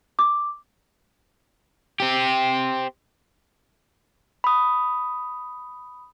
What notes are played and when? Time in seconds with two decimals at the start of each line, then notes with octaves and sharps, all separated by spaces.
0.19 D6
2.00 C4 G4
4.44 B5 D#6